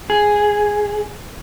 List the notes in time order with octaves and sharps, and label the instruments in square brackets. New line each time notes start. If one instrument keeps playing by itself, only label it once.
[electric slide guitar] G#4